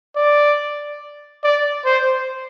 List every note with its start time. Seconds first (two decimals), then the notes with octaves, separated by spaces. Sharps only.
0.16 D5
1.44 D5
1.85 C5